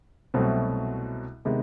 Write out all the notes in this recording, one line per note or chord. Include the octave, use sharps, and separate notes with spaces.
C2 B2 F#3 A3 C4
C3 D#3 G#3 B3 D#4